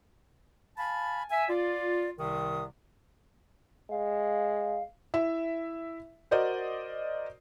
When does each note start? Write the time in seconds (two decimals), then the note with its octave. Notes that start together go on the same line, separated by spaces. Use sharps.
0.78 F5 G#5 A5 B5
1.30 E5 G#5
1.49 F4 D5
2.19 C2 C3 D#3 D#6
3.91 G#3 F5
5.14 E4 E5
6.31 F#4 A#4 C5 D5 D#5